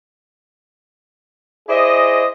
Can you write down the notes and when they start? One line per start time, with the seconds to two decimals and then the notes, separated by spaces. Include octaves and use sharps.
1.69 E4 G#4 C5 D5 D#5